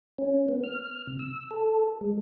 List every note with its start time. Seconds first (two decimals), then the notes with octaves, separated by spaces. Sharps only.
0.18 C#4
0.48 B3
0.64 F6
1.07 C3
1.19 E6
1.51 A4
2.01 G#3